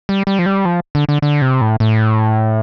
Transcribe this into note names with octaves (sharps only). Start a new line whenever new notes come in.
G3
G3
F3
G3
F3
D3
D3
D3
C3
A2
A2